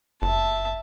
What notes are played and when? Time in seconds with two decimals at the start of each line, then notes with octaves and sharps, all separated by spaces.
0.22 F#1 E5 A5